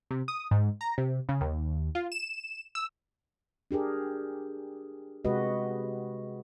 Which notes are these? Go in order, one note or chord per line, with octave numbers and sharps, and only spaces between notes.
C3
D#6
G#2
A#5
C3
C#3
D#2
F4
E7
E6
D4 G4 G#4 A#4
C3 G#3 F#4 G4 B4 D#5